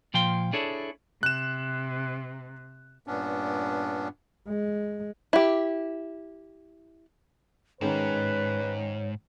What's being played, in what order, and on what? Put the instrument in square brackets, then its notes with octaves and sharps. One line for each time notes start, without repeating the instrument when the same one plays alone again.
[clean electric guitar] A#2 F3 F5 G5 C6
D4 E4 G#4 A4 C#5
[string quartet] C3 [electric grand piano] F#6 E7
[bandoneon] G2 A#2 B3 C#4 D4
[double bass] G#3
[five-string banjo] E4 G4
[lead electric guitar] G#2 [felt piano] D#3 G#3 C#4 [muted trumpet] B4 [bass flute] C#5